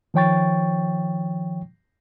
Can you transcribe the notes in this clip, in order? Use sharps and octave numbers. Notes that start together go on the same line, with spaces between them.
D#3 F3 C#5 G5 C#6 A6